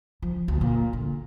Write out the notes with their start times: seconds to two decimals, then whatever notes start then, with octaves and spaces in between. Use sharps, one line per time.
0.22 F3
0.48 D2
0.61 A#2
0.93 D3